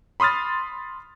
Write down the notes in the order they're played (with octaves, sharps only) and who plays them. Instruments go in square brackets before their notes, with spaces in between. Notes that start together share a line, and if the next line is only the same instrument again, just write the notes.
[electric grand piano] B5 C6 D#6 F6 A6